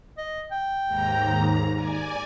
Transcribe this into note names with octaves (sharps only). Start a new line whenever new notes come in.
D#5
G5
D#2 G#2 A#5
D5 G#5